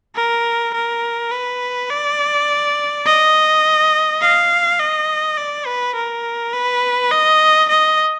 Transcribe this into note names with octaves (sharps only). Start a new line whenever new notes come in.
A#4
A#4
B4
D5
D#5
F5
D#5
D5
B4
A#4
B4
D#5
D#5